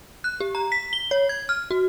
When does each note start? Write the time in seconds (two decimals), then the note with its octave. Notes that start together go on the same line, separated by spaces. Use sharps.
0.24 F#6
0.40 G4
0.55 A#5
0.72 B6
0.93 G7
1.11 C#5
1.29 G#6
1.49 F6
1.71 F#4